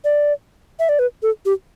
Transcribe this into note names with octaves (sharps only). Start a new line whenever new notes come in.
D5
E5
D5
B4
A4
G4